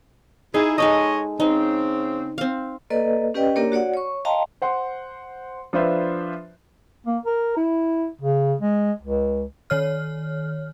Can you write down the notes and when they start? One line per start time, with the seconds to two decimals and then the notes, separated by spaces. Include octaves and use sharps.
0.54 D#4 E4 G#4
0.78 G#3 D#4 A4 C#5 D#5
1.40 C#3 C4 D#4
2.38 C4 F5
2.90 A#3 A4 B4 D5 D#5
3.34 C#4 G4 B4 D5 D#5 G5
3.56 A#3 D4 G4 A#4 C#5 D5
3.72 F#4 C#5 D5 F#5
3.94 C#5 C#6
4.25 D#5 F5 G5 A5 A#5 C6
4.62 C5 F#5 C6
5.73 F3 D4 F4 B4 C5 E5
7.07 A#3
7.26 A#4
7.57 E4
8.21 C#3
8.61 G#3
9.02 C#2
9.70 D#3 C#5 F6